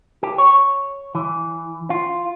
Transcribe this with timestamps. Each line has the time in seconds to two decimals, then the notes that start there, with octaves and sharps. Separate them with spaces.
0.23 G4
0.38 C#5
1.15 E3
1.90 F4